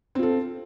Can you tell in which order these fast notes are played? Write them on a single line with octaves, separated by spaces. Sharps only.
C4 F4 A4